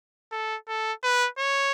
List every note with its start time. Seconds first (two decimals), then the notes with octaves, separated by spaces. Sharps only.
0.32 A4
0.68 A4
1.03 B4
1.38 C#5